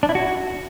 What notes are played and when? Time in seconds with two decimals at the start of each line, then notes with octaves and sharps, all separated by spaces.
0.03 D4
0.09 E4
0.15 F#4